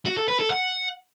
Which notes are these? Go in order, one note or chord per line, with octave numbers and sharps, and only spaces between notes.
F#4
A4
B4
A4
F#5